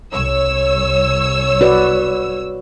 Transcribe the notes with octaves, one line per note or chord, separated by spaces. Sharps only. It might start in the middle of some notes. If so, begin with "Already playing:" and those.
C2 C#5 E6
F#4 B4 D5